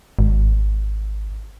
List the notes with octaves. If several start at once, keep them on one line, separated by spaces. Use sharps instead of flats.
G#1